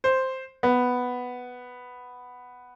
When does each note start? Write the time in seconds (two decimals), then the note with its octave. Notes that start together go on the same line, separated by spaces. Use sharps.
0.04 C5
0.63 B3